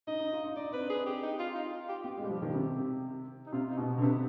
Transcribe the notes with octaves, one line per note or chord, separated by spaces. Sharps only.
D#4 D#5
D#4
F4
D#4
D#4 D5
C4 B4
D4
G#4
C4 G4
D#4
F4
D#4
F4
G4
B3 G4
G#3
G3
F3
D#3
C3
D#4
C3 F4
D#4
B2
B3
D3
C3 B3